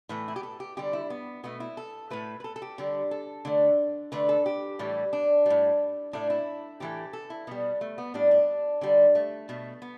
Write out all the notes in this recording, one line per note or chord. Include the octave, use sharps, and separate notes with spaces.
A2 E3 A3 B4
E4
G4
A4
G4
D3 G3 G4
E4
B3
B2 A3 B3
E4
A4
A2 A3 B4
B4
A4
A4
G4
D3 G3
A4
D3 A3
D3 A3 B4
A4
G4
A2 E3 G3
D4
A2 G3
A2 A3 D4
E4
A2 E3 A3 G4
A4
E4
B2 G3 B3
A3
B3
A2 G3 D4
D4
D3 G3
A3
B2 A3
B3